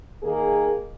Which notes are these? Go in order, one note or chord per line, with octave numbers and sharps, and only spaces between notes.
D#3 A#3 G#4